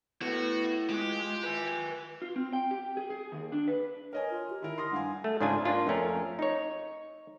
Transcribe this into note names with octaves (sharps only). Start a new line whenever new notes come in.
B3 E4 F#4 A4
G#3 F4 G4
B4 G#5
F4
C4
G5
G4
G#4
G#4
D#2
D4
B4
A#4 C#5 D#5 G#5
F4
G4
D#3 E4 A#4
C6 D#6 A#6
G2 F5 F#5 G#5
A3
G#2 C#3 D4 F4 G#5 A5
A#3 D4 F4
F2 A3 C#4 A#4
D#4 C#5